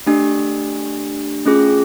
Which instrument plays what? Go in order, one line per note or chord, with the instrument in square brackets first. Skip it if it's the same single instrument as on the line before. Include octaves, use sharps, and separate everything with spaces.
[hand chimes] A3 D4 G4
A3 C#4 F4 G#4